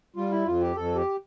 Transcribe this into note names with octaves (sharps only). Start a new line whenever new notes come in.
G3 F4
E4
F2 F4
G4
F2 A4
G4